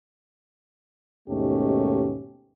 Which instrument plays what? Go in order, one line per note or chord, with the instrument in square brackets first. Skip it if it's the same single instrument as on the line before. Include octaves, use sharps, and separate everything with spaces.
[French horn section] D#2 G#2 B2 A3 C#4 G4